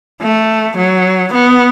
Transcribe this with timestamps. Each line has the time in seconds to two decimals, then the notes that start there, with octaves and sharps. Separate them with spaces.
0.21 A3
0.77 F#3
1.33 B3